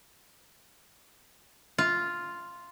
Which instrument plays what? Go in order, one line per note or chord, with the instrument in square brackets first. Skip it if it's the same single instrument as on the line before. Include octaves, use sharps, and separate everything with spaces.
[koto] F4